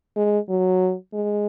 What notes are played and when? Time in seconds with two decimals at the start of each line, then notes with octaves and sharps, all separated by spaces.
0.16 G#3
0.49 F#3
1.14 G#3